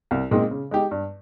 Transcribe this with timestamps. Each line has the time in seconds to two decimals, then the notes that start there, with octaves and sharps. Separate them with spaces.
0.11 C2
0.31 A#2 G#3 C4 D#4
0.51 C#3
0.71 G#3 D#4 G4
0.91 G2